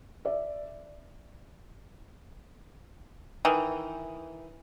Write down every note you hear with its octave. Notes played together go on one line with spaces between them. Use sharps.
D5 E5
D#3 E3